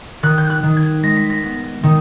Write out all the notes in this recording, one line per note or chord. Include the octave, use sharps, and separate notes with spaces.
D#3 F#6
G6
F#6
D#3
G#6
G#3 A#6
B6
A#6
B3
D#3